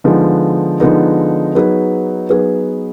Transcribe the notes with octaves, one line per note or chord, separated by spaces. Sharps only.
D3 F3 G#3 B3 D#4
D3 F3 G#3 B3 D#4
F#3 B3 D#4 G#4 B4
F#3 B3 D#4 G#4 B4